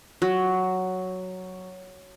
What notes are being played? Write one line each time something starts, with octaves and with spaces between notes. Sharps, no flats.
F#3